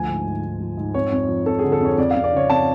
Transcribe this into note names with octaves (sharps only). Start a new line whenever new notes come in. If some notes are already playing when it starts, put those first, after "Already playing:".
Already playing: D2 F3 G#5
G#2
G#2
G#2
F3
G#2
F2 C#5
F2
F3
F2 A4
D3 G#4
A4
F2 C#5
F2 D5
F2 F5
D5
C#3 C#5
F2 A5